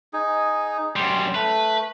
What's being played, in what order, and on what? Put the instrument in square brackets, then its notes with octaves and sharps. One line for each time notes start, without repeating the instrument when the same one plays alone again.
[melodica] D#4 G#4
[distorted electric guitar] F#2 G3 [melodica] C6
[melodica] A3 [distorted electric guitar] B4